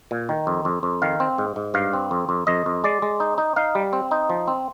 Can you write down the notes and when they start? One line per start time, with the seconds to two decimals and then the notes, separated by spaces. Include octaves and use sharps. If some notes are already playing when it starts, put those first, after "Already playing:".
0.11 A#2
0.29 D#3
0.47 F2
0.65 F2
0.83 F2
1.02 D#3 F5
1.20 C4
1.38 G#2
1.56 G#2
1.74 G2 F5
1.93 C4
2.11 F2
2.29 F2
2.47 F2 D#5
2.66 F2
2.84 G#3 D5
3.02 G#3
3.20 D#4
3.38 D#4
3.56 D#4 F5
3.75 G3
3.93 C4
4.11 D#4
4.30 F3
4.48 C4